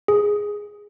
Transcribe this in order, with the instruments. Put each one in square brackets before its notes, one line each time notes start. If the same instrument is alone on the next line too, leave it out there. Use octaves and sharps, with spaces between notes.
[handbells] G#4